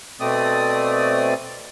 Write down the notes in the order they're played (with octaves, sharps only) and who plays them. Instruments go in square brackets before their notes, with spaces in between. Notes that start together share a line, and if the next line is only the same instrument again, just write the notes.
[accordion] B2 A3 C4 D5 D#6